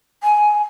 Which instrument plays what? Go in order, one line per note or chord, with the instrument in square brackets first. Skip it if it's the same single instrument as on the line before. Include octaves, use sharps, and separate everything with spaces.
[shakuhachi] G#5